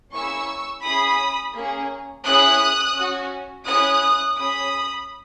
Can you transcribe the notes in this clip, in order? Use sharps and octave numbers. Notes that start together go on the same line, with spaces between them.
A#3 C#4 E4 G#4 C#6 E6
C#4 E4 G#4 B5 D#6
A#3 C#4 G#4
C#4 E4 G#4 D#6 F#6
C#4 F#4
C#4 E4 G#4 D#6 F#6
C#4 G#4 B5 D#6